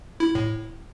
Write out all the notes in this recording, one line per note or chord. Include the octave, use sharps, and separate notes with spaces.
E4
A2